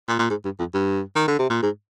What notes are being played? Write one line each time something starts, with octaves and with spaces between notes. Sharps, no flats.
A#2
A#2
G#2
G2
F2
G2
D#3
D3
C3
A#2
G#2